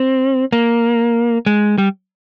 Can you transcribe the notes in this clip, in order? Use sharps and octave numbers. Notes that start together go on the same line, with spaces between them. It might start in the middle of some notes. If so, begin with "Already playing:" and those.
Already playing: C4
A#3
G#3
G3